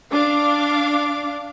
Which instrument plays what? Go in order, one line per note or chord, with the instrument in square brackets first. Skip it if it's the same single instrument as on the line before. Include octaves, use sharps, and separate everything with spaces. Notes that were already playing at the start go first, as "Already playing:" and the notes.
[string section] D4 F5 D6